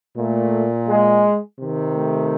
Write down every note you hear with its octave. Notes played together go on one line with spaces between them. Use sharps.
A#2 A3
G#3
C3 D#3
A3